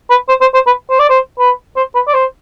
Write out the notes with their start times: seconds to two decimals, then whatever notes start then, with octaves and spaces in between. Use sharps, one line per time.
0.10 B4
0.29 C5
0.41 C5
0.54 C5
0.67 B4
0.90 C5
0.99 D5
1.09 C5
1.39 B4
1.76 C5
1.95 B4
2.07 D5
2.14 C5